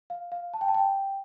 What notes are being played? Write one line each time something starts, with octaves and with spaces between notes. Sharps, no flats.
F5
F5
A5
G5
A5
G5